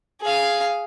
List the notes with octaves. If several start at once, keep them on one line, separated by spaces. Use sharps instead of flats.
G#4 F5